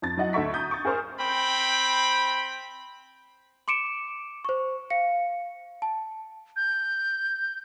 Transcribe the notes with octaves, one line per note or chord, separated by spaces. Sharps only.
F2 A6
F#3 E4 D#5 F#5
D2 A4 E5 C#6 B6
A#5 D#6 G6 A6
C#6 A6
G#4 A#4 C5 C#6 F6
C4 G5 B5
C6 D6 C#7 D7 E7
C5 C#6
F5 C#7
A5
G6